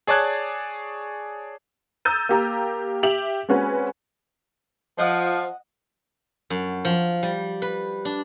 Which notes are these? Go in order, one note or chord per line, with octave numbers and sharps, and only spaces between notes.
G#4 C#5 D5 A5 F#6 G#6
A#5 D#6 E6 G6 A6 D#7
A#3 G4 A#5
G4 E5 F7 F#7
G#3 C4 C#4 F#4 B4 G#5
F3 D#5 F#5
F#2
F3
G3
B4
D4